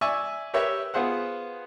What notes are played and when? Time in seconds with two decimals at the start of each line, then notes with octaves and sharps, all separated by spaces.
0.01 D5 E5 G#5 C#6 E6
0.54 G4 A#4 B4 C#5 E5 G5
0.94 B3 F4 G#4 C5 F#5